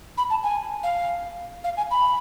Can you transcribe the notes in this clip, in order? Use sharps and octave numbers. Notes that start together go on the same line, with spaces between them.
B5
A5
G#5
F5
F5
G#5
B5